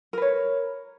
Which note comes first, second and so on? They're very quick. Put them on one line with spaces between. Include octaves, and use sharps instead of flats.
A#4 B4 C#5